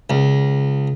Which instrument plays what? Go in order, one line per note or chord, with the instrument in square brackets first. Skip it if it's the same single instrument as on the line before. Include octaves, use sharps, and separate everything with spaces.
[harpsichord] C#2